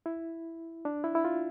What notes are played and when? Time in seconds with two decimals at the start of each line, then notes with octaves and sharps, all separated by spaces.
0.06 E4
0.85 D4
1.04 E4
1.15 E4
1.25 F4